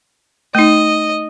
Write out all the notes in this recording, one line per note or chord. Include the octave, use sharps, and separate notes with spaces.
A3 D#4 D#5